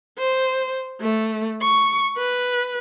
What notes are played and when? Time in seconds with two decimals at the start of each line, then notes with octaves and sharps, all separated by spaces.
0.18 C5
1.01 A3
1.61 C#6
2.17 B4